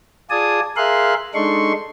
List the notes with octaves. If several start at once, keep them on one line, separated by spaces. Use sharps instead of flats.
F4 G#4 D5 G#5 A5 D#6
G#4 A#4 E5 F5 C6 F#6
G#3 D4 D#4 A4 C6 C#6